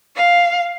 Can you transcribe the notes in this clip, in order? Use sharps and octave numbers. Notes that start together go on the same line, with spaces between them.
F5